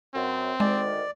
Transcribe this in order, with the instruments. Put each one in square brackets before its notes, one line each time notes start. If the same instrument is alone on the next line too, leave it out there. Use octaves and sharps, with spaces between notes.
[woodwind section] F#2 [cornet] C4
[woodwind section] D2 G#2 D#3 [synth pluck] G#3 [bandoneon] D5